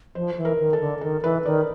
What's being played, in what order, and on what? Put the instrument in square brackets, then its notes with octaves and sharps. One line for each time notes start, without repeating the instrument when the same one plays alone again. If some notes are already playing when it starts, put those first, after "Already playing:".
[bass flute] F3 [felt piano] C5
[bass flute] E3
[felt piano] A#4
[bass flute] D#3
[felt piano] A4
[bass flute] D3
[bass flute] D#3 [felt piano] A4
[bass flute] E3 [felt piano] B4
[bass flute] D#3 [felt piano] D5